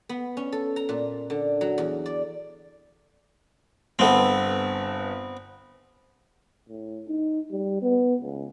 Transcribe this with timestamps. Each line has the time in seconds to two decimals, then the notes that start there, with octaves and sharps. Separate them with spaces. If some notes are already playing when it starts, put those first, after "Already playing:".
0.09 B3
0.37 C#4
0.52 A4
0.76 A#5
0.89 A#2
1.30 D3
1.61 F#3
1.78 E2
2.06 D5
3.99 G1 B3 C4 A4
6.69 A2
7.08 D#4
7.51 G3
7.82 B3
8.22 C#2